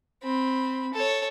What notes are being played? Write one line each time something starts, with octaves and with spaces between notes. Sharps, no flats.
C4 B5
A4 C#5